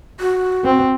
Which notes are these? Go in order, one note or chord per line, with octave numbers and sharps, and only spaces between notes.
F#4
C4